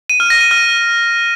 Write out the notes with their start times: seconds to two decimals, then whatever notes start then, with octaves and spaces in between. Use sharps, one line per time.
0.10 D#7
0.20 F6
0.30 A#6
0.41 D#7
0.51 F6